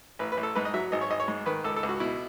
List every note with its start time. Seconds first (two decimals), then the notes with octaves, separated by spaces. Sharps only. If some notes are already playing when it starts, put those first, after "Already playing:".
0.19 A1 B4
0.32 B4
0.37 A1
0.43 A4
0.55 G#2 B4
0.65 D#5
0.74 F#3 E5
0.92 G#1 D#5
1.01 C#5
1.10 G#1 D#5
1.20 C#5
1.28 G#2
1.46 D#3 B4
1.64 C#2 A4
1.76 A4
1.83 C#2
1.89 F#4
2.00 B2 E4